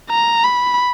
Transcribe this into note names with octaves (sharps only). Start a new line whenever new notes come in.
A#5
B5